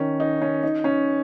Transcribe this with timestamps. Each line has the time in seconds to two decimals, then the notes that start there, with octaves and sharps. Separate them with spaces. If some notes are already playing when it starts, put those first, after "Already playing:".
Already playing: D#3 C#4
0.20 D#4
0.42 C#4
0.63 D#4
0.84 C#4